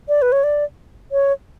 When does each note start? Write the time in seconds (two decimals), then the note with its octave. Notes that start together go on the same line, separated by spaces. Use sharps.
0.08 D5
0.22 B4
0.32 C#5
0.44 D5
1.12 C#5